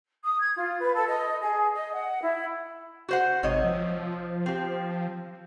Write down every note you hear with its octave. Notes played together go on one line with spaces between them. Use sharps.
D#6
G#6
F4
B4
A4
D#5
G#4
D#5
F#5
E4
F#4 C5 F#5
G#1 C3 C#5 D#5
F3
C4 G4